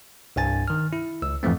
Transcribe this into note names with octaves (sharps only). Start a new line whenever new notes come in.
C2 G2 G#5 A6
D#3 F6
E4
C#2 E6
F2 G#2 E3 F3 A3 C4